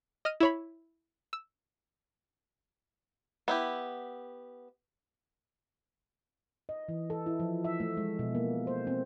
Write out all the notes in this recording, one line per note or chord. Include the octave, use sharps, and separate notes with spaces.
D#5 F6 D#7
E4 C#5 B5
E6
B3 E4 G4
D#5
E3
A4
E4
F3
E5
A3
G#3
B2
A#3
C5
C4